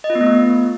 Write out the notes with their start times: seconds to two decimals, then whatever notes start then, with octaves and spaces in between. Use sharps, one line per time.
0.04 D#5
0.10 F4
0.15 B3
0.21 A3
0.26 B3